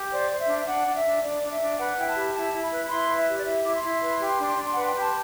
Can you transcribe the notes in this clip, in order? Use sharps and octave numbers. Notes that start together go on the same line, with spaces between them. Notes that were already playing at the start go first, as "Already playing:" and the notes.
Already playing: G4
C5 D5
C5
E5
D4
E5
D4 F#5
D4
E5
D4
D4 D5
D4
E5
D4
B4 F#5
E4 G5
A5
G4
E4 A5
E4
B5
B4
E4 C6
B4
E5
G4
D5
E4 E5
E4 D6
C6
E4
B4
G4
D4
D4
B4 F#5
G5
G4 A5